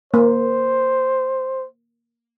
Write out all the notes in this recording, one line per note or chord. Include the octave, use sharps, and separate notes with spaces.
A#3 C5